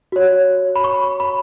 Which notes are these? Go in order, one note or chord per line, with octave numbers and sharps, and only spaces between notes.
F#4 C#5
B5
C#6
B5